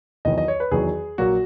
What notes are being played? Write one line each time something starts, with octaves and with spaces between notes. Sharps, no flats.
E2 D#3 F#3 D#5
D#5
C#5
B4
E2 D#3 F#3 G#4
A#1 A#2 F#3 A#3 F#4